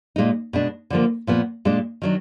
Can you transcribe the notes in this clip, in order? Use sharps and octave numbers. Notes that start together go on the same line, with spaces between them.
A#2 G#3 D#4
B2 G#3 D4
D3 F3 A#3
A#2 F3 B3
A#2 G#3 D4
D#3 F#3 D4